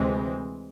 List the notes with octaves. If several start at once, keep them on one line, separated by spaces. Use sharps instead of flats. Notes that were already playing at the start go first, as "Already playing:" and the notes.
Already playing: D2 C3 E3 G#3 C4